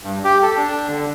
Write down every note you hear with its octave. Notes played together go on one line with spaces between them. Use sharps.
G2
G4
A4
D4
D3